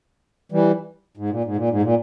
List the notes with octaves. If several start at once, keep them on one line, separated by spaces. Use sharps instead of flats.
E3 G3
G#2
A#2
G#2
A#2
G#2
A#2